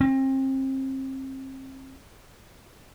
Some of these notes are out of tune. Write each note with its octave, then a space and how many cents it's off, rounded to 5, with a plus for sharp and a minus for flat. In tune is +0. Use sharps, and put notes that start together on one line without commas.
C4 +35